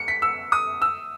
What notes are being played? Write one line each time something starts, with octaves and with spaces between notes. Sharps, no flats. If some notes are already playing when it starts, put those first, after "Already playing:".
Already playing: C#7
B6
E6
D#6
E6